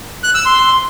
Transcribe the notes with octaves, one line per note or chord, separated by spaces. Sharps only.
F#6
E6
C6